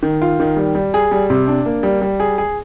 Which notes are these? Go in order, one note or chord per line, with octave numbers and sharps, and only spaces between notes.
D#3
F4
D#3
G3
G3
G#4
G3
C3
D4
A#3
G3
G3
G#4
G#4